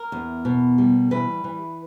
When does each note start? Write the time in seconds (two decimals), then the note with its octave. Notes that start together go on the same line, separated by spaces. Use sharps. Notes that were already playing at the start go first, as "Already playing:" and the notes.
Already playing: A#4
0.12 E2
0.45 B2
0.78 G3
1.11 E3 B4
1.44 E3